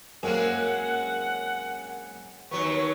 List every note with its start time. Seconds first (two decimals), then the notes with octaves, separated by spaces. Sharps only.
0.23 F#2 G#3 A#3 C4 C#4 F#5
2.51 D#2 F#3 B3 C#6